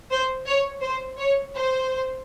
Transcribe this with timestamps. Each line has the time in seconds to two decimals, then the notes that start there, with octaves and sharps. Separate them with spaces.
0.10 C5
0.46 C#5
0.82 C5
1.19 C#5
1.55 C5